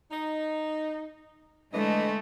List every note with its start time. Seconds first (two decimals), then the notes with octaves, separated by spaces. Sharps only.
0.12 D#4
1.73 D3 E3 G#3 A3 D#5